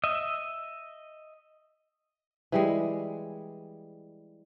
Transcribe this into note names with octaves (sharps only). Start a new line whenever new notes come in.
D#5 E5
E3 G3 G#3